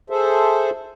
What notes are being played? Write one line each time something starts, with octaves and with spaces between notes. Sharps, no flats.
G#4 A4 C5 E5